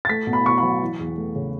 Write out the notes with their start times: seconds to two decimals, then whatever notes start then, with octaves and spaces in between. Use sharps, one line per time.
0.05 A6
0.09 A3 B6
0.27 B2
0.33 B5
0.45 B2 C#6
0.58 B5
0.63 F#3
0.81 E3
0.99 E2
1.17 A3
1.35 C#3